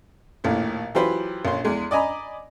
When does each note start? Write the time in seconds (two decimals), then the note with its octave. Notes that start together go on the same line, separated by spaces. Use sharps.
0.44 A#1 D#2 A2
0.95 E3 F#3 F4 G4 B4 C5
1.45 A#1 C#4 C6
1.65 E2 G#3
1.91 D5 D#5 G#5 A#5 B5